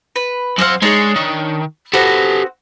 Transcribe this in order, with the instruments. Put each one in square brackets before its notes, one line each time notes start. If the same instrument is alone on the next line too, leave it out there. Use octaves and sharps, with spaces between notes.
[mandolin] B4
[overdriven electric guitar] F#2 F#5 [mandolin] C4 C5 F5
[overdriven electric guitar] G#3 G#4 [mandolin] D4 D#4 C#5
[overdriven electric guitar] D#3
[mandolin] B3 C4 F#4 [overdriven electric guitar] G4 A4